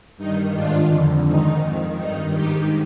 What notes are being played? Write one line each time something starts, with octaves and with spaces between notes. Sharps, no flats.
G2 D#3 D#4
G#2 D#3 D4 F4
F2 D3
G#2 D#3 D#4
F2 D#3
G2 D#3 D#4
G#2 D#3 D#4 G4